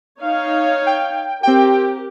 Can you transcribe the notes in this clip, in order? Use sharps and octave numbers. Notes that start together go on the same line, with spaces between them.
D#4 C#5 F5
G5
C4 G4 A#4 G5